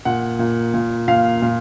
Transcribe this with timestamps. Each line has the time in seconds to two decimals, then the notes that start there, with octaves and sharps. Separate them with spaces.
0.05 A#2 F#5
0.39 A#2
0.74 A#2
1.08 A#2 F5
1.42 A#2